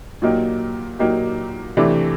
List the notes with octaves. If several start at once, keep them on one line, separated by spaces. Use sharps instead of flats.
A#2 F#3 A#3 D#4 G4
A#2 F#3 A#3 D#4 G4
C3 E3 A3 D4